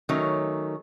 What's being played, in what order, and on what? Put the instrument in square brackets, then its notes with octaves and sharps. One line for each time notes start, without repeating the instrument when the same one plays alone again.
[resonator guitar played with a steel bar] D#3 F#3 A3 C#4